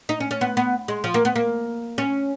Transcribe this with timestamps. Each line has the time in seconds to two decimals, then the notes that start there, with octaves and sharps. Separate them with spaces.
0.09 D#4
0.20 C#4
0.31 C#4
0.41 B3
0.57 B3
0.88 G#3
1.04 F3
1.14 A#3
1.25 B3
1.36 A#3
1.98 C#4